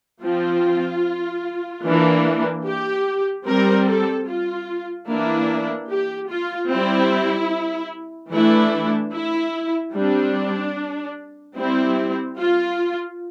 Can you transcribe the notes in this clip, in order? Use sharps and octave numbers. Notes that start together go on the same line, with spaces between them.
F3 C4 F4
E3 A#3 D4
G4
G3 C4 A#4
A4
F4
E3 A#3 D4 E4
G4
F4
G3 C4 E4
E3 A3 D4 E4
E4
G3 C4 D4
G3 C4 E4
F4